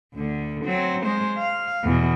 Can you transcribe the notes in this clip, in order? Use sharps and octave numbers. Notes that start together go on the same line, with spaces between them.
D2 D3
F#3 C4
G#3 C5
F5
E2 B2